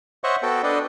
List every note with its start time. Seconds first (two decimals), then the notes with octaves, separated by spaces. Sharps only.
0.24 C5 C#5 D#5 E5 F#5 C#6
0.43 B3 F#4 A4 G5
0.63 D4 A4 B4 D5 D#5